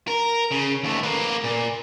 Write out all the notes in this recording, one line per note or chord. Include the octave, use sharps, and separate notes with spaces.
A#4
C#3
D#2 A3
A#3 B4
A#2